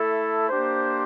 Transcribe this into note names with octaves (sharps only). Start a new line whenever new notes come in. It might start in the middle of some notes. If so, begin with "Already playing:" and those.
Already playing: A3 E4 A4
A#3 D4 G4 C5